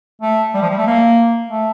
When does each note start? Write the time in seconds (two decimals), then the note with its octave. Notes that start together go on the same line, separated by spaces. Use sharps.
0.22 A3
0.54 G3
0.62 F3
0.70 G3
0.78 A3
0.86 A#3
1.49 A3